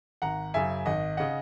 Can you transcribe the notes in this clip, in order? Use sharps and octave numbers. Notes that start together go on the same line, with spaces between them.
G#1 F#5 A#5
F#2 C#3 E5 G#5
G#1 D#5 F#5
C#3 D#5 F#5